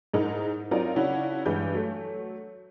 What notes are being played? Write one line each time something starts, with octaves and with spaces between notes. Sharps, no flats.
G#2 G#3 D#4 E4 A#4
F#3 C4 D#4 F4 A#4 D5
C#3 C#4 D4 E4 F#4
G2 E3 G#3 B4 G6
F#3 A3